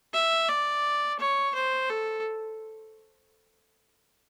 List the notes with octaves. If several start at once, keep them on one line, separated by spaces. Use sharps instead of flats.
E5
D5
C#5
C5
A4